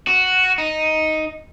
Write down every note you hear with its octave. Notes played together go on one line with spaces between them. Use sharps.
F#4
D#4